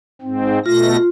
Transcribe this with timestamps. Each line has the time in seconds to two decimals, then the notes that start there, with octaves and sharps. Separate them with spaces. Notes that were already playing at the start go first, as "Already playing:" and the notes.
0.22 G#2 C4
0.66 B2 A3 F4 A#6